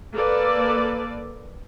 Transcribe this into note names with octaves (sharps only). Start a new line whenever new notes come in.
A#3 A4 B4 D5